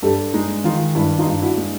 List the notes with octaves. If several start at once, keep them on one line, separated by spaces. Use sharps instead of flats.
G2 G4 A4
G#3 D#4
D#3 D#4 F4
G2 E4
D#4 F4
G2
E4 F#4
G#3